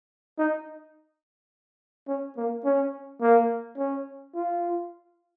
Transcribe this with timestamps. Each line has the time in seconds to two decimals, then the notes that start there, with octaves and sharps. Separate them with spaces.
0.38 D#4
2.08 C#4
2.37 A#3
2.65 C#4
3.21 A#3
3.78 C#4
4.35 F4